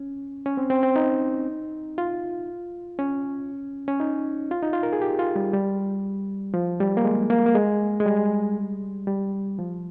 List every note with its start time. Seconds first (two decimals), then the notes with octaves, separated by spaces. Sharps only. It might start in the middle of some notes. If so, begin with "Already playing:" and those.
Already playing: C#4
0.46 C#4
0.57 C4
0.70 C4
0.83 C4
0.96 D#4
1.98 F4
2.99 C#4
3.88 C#4
4.00 D#4
4.51 F4
4.62 D#4
4.73 F4
4.83 A#4
4.93 G#4
5.02 G4
5.19 F4
5.36 G3
5.53 G3
6.54 F3
6.80 G3
6.97 A#3
7.05 G#3
7.30 A#3
7.46 A#3
7.55 G#3
8.00 G#3
8.06 G3
9.07 G3
9.59 F3